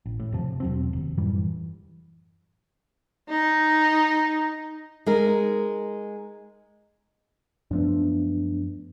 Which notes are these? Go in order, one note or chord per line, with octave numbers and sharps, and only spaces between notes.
A1
A2
F2 C3 F3
E1 F#3 C4
F1 D#2
F#2 A2 E3 G3
D#4
G#3 D#4 A#4
F#2 F3 A3 B3 D4